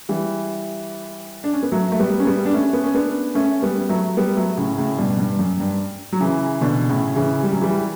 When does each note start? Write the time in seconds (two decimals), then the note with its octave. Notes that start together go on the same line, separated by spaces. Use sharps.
0.09 E3 G3
1.44 D4
1.53 C#4
1.63 B3
1.72 F#3 A3
1.92 A3
1.99 G3 B3
2.19 C#4
2.26 G3 B3
2.46 D4
2.53 A3 C#4
2.73 B3
2.84 C#4
2.95 B3 D4
3.35 A3 C#4
3.62 G3 B3
3.89 F#3 A3
4.17 G3 B3
4.37 F#3 A3
4.57 A2 C#3
4.78 A2 C#3
4.98 G2 B2
5.18 G2
5.39 F#2
5.60 G2
6.12 F#3
6.20 C#3 E3
6.61 B2 D3
6.89 A2 C#3
7.16 C#3 E3
7.43 G3
7.53 F#3
7.62 E3 G3